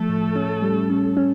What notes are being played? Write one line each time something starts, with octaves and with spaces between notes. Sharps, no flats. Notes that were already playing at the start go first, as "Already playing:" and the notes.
Already playing: F3 A3 A4
A2
C#4
G3
C#4
C#4